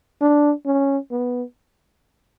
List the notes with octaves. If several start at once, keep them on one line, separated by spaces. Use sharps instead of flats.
D4
C#4
B3